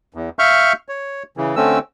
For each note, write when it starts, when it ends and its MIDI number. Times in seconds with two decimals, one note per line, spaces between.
0.14 0.29 40
0.39 0.73 76
0.39 0.73 77
0.39 0.73 85
0.39 0.73 89
0.39 0.73 91
0.89 1.23 73
1.37 1.56 49
1.37 1.56 52
1.56 1.79 50
1.56 1.79 57
1.56 1.79 60
1.56 1.79 61
1.56 1.79 88